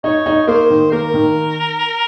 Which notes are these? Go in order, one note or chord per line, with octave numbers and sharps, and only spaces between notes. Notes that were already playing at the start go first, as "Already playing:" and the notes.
D#4 C#5
D#4
A#3 C5
D#3
A#3 A#4
D#3